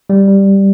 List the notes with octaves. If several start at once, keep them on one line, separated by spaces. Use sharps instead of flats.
G3
G3